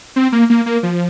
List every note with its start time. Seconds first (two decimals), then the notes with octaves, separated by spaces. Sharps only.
0.16 C4
0.32 A#3
0.50 A#3
0.66 A#3
0.83 F3